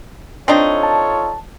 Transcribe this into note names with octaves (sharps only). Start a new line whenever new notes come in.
C4 D4 D#4 F4 A4 C#5
A5